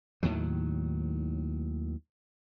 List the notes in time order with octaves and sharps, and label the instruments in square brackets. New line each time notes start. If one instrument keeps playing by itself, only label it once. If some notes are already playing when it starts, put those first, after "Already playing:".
[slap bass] D#2 A2 D#3 F#3